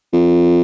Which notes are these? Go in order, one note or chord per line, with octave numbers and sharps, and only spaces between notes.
F2